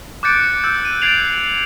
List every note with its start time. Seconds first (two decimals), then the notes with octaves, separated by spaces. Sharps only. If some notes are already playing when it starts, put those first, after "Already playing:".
0.23 D6 F#6 G6 A6 C#7 D7
0.63 E6 G6 D7
0.85 D#7
1.01 G#6 A6 C7 D7 F7 F#7